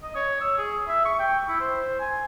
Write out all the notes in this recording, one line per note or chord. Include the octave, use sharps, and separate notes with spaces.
D#5
C#5
E6
G#4
E5
C#6
G5
E4
C5
G#5